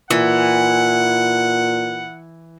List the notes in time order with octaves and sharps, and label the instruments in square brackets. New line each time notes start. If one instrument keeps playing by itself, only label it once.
[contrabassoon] A#2 [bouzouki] E3 [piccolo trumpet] F#5